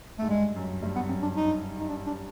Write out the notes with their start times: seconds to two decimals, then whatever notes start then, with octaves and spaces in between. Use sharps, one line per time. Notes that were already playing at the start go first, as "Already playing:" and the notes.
0.19 G#2 A3
0.28 G2 G#3
0.56 F#2
0.82 G2 A3
0.96 B3
1.09 F#2 C4
1.22 D4
1.36 D#4
1.80 D#4
1.89 D4
2.07 D4